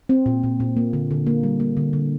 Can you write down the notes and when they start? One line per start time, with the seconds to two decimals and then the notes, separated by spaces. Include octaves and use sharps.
0.09 C4
0.26 A#2
0.43 A#2
0.60 A#2
0.77 A#3
0.93 D3
1.11 D3
1.27 A#3
1.43 G3
1.60 A#3
1.77 D3
1.93 D3